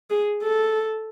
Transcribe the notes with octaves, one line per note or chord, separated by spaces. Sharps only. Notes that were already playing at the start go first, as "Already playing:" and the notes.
G#4
A4